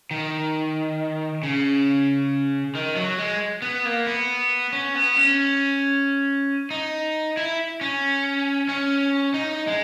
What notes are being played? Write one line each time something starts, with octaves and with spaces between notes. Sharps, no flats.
D#3
C#3
D#3
F#3
G#3
B3
A#3
B3
C#4
B3
C#4
D#4
E4
C#4
C#4
D#4
G#3